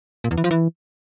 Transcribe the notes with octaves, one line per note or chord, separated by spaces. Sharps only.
A#2
E2
E3
F3
E3